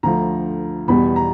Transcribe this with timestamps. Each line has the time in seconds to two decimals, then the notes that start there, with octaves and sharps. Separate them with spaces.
0.03 D2 D3 F3 A#5
0.88 E2 B2 G3 B5
1.16 A#5